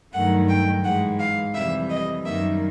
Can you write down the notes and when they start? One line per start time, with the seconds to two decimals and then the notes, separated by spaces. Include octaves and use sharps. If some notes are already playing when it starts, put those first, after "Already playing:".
0.14 G2 D#3 F#3 A3 F#5
0.49 G5
0.84 G#2 E3 G#3 F#5
1.19 F5
1.55 F2 C3 E3 G3 E5
1.90 D#5
2.25 F#2 D#3 G3 A#3 E5